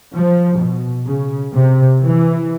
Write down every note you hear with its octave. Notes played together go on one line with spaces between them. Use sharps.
F3
B2
C#3
C3
E3